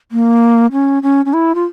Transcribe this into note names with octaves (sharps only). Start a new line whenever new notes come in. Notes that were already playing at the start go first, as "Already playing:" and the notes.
A#3
C#4
C#4
C#4
E4
F4